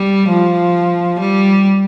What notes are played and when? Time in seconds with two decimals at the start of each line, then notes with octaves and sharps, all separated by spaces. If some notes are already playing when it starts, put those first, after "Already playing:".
Already playing: G3
0.29 F3
1.20 G3